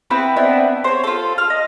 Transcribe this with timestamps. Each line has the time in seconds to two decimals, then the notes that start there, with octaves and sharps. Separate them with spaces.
0.10 B3 C4 E4 B4
0.36 B3 C4 D4 E4
0.84 C5 C#5
1.04 F4 A4
1.38 F6
1.50 D#5